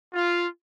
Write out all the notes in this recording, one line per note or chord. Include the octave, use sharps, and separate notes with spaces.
F4